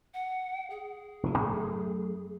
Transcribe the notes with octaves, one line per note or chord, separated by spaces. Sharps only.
F#5
G#4
F1 E3
F#2 A3